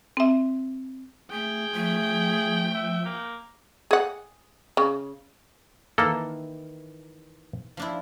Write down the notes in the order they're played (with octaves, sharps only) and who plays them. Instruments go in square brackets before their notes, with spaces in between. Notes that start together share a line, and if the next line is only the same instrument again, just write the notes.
[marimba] C4 E5
[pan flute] A3 [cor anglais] G#4 [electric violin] G5
[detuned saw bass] F3 [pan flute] A3
[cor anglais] E5
A#3
[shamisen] G#4 F#5
C#3
[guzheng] D#3 E3 [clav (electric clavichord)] A#3 A4
[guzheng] F3 D4 E4